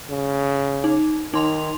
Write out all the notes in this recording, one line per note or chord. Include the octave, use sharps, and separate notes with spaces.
C#3
D#4
D#3 D#4 C6 F7